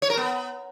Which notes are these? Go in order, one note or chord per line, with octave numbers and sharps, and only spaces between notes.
C#5
A#4
B3